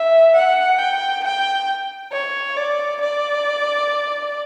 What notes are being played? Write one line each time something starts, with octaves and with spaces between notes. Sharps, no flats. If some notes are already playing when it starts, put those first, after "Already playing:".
Already playing: E5
F#5
G5
G5
C#5
D5
D5